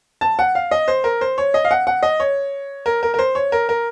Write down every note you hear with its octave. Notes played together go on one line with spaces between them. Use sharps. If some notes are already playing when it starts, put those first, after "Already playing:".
A5
F#5
F5
D#5
C5
A#4
C5
C#5
D#5
F5
F#5
F#5
D#5
C#5
A#4
A#4
A#4
C5
C#5
A#4
A#4